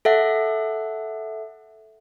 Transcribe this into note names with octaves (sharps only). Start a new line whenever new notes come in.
A4 E5 F#5